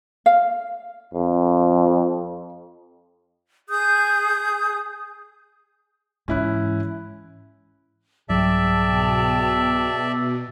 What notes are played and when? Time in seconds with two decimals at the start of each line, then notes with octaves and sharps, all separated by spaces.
0.26 F5
1.14 F2
3.68 G#4 D#6 G6
6.28 G#2 E3 C#4 E4 F#6
8.29 C2 G#2 F#3 G#4 D5 E5 G5 A5
8.80 B2